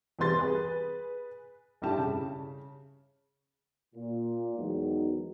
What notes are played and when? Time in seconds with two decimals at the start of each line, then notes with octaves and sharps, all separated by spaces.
0.19 E2 C3 G3 B4 C6 A6
0.39 G#4 B4
1.82 F1 G2 E4 G4 A5
1.98 C#3
3.94 A#2
4.57 E2 D#3 F#3 G#3 B3 D#4